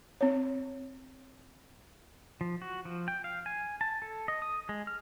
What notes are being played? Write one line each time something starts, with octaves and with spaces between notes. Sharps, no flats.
C4 C#5
F3
F#4
F3
G5
F5
G#5
A5
A4
D#5
D#6
G#3
F6